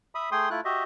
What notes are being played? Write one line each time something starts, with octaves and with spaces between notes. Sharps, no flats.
E5 B5 D#6
A3 G#4 G5 C6 D#6
A3 E4 F4 F#6
F#4 G4 D#5 E5